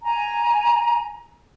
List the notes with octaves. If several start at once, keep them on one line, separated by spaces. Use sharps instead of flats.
G#5 A#5